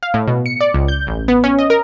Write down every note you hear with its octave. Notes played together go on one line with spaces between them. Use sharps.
F5
A2
B2
C#7
D5
C#2
G6
A1
B3
C#4
D#5
A#4